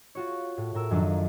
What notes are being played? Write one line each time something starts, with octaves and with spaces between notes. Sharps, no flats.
F4 F#4 C#5
A2
A2 A#4 E6
F#2 D#3 F3 F#3 D4 D#7